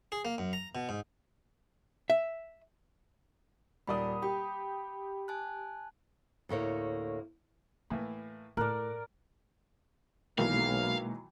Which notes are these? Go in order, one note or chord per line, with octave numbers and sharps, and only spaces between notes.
G#4
A#3
F#2
A#5
B2
G#2
E5
D#1 A#4 D5 F#5 B5 D#6
G4 G5 B5
G#5 A5 F#6
D2 A2 A#3 C#5
A2 E3 A#3 E4
A2 A4 A#4 D5 F#6
B1 B2 D#3 E3 F#3 G#3 A#3 F5